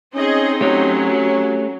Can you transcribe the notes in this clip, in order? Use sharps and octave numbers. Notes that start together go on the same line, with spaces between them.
C4 C#4 D#4 G#4 D#5
F#3 A3 C#4 G4 C#5